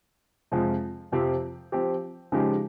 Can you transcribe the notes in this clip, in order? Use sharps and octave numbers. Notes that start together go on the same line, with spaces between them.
F2 C3 F3 G#3
F2 C3 F3 C4 G4
F3 C4 G4
C#3 F3 G#3 D#4 G4